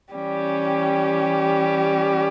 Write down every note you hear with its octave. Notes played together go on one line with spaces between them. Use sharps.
E3 G3 C#4 G4